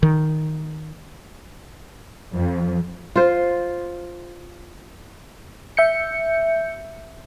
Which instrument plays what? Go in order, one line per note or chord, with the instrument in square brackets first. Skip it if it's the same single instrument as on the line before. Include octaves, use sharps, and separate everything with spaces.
[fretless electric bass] D#3
[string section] F2
[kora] F4 C5
[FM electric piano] E5 G6 C#7